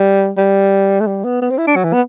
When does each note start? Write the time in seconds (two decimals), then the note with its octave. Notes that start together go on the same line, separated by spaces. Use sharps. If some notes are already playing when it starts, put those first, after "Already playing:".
Already playing: G3
0.37 G3
1.00 A3
1.07 G3
1.24 B3
1.42 B3
1.50 C4
1.58 E4
1.67 D4
1.76 F#3
1.84 E3
1.93 B3